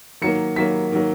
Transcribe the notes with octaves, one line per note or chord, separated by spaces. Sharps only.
D#3 F#3 A#3 C#7
D#3 F#3 A#3 B6
D#3 F#3 A#3